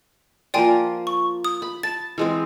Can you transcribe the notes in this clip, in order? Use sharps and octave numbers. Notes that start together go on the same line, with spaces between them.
F3 A#3 D5 G5 G#5 C6
C#6
D#6
B5
A5 A6
E3 G#3 C4